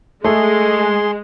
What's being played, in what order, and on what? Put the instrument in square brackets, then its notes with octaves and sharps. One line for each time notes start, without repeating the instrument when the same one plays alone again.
[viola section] G#3 [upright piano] A3 [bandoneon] G#4 C6